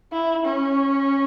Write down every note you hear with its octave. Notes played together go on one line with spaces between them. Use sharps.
E4
C#4